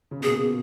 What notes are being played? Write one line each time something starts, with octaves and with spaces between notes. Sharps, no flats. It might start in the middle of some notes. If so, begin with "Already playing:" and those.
C#3
B2
A#2 G#4
B2